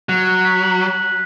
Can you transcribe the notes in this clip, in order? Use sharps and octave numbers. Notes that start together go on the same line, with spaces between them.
F#3 F#6
F#6
B6
F#7
F#6
F#6